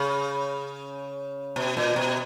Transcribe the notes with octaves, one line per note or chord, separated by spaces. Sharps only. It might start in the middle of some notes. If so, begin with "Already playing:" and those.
Already playing: C#3
B2
A#2
B2